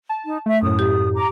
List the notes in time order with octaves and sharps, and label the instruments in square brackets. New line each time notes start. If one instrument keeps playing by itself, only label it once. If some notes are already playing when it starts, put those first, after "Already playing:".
[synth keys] A5
[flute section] D#4
[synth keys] A3 [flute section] E5
[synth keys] F#2 A2 [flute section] D#6
[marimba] G4
[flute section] A#5 D6